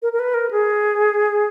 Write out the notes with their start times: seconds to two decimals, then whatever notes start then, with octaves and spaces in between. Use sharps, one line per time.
0.02 A#4
0.13 A#4
0.19 B4
0.34 A#4
0.51 G#4